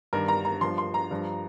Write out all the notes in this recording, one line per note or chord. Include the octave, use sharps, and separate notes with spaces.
G2 D#3 G3 A#4
A#5
A#5
G2 F3 C6
C6
A#5
G2 F3